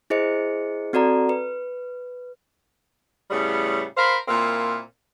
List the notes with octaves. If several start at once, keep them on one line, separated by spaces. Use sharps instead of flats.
E4 G#4 C5 D#5 C#7
C4 F#4 A4 D5 A#5
B4
A2 C#3 G3 B3
A#4 C5 F5 B5
A#2 A#3 C4 E4